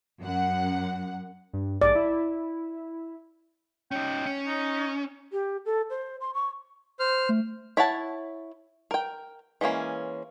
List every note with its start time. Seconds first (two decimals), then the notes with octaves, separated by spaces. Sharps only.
0.21 F#2 F#5
1.53 G2
1.82 A#1 G#2 D5
1.95 E4
3.91 C#4 D#4 G5
4.26 C#4
4.47 D#4
5.31 G4
5.66 A4
5.90 C5
6.21 C6
6.34 C#6
6.99 C5 F6
7.29 A3
7.77 E4 C#5 F#5 A5
8.91 A#4 G5
9.61 E3 G#3 A#3 C#4